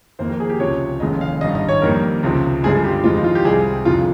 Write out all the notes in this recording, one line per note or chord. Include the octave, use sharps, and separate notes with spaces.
F2 D#3 A#3 C5
A#4
G#4
G4
C#2 C3 F3 C#5
F1 D#2 C#3 G#3 D#5
F5
G#1 G2 G3 D#5
D#5
C#5
F2 D#3 G3 A#3 A#4
C#2 C3 F3 C4
G1 G2 F3 G#3 C4 G#4
G4
F2 D#3 G#3 C4 F4
D#4
F4
G4
C2 C3 G3 C4 G#4
G1 F2 C3 F3 F4